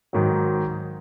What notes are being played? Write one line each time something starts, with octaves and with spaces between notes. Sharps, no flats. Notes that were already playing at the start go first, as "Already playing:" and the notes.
G#2 D#3 F#3